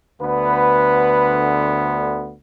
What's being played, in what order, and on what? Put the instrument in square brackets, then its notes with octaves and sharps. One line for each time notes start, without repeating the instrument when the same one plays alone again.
[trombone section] D2 D3 B3 B4